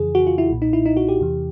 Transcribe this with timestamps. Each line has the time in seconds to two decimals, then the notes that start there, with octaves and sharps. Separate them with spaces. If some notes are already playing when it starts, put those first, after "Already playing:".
Already playing: F2 C#3 E3 G#4
0.15 F#4
0.27 F4
0.38 E4
0.50 B1 A#2
0.62 D#4
0.73 E4
0.86 D#4
0.97 F#4
1.08 G4
1.20 E2 C3 E3